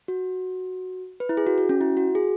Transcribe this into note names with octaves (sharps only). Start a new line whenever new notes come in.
F#4
B4
E4
G#4
F#4
F#4
C#4
E4
F#4
G#4